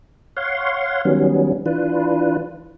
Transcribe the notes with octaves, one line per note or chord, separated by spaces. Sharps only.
C#5 F5 F#5 C6
D#3 F#3 G3 B3 C#4
E3 D4 F4 B4